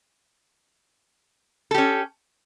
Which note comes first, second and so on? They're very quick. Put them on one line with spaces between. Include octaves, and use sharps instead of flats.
A4 G4 C#4